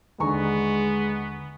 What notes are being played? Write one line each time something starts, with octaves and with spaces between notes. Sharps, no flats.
D#2 D3 G#3 B3 G#5 A#5 C#6